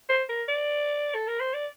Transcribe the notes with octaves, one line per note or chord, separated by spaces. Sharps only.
C5
A#4
D5
A4
A#4
C5
D5